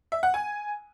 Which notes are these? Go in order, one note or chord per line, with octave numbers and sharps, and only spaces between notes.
E5
F#5
G#5